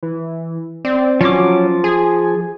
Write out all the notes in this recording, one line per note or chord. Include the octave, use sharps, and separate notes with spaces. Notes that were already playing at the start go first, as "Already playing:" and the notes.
E3
C4 D5
F3 F#3 C#4 D6
G#4 G#5